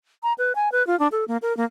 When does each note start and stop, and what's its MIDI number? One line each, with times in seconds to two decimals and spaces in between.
0.23 0.33 82
0.38 0.53 71
0.55 0.71 80
0.72 0.85 71
0.87 0.98 65
0.99 1.08 62
1.12 1.25 69
1.28 1.37 58
1.42 1.55 70
1.57 1.65 58